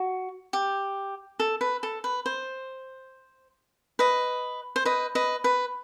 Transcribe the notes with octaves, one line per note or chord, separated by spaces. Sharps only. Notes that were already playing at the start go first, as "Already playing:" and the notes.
Already playing: F#4
G4
A4
B4
A4
B4
C5
B4 D#5
C5
B4 D#5
B4 D#5
B4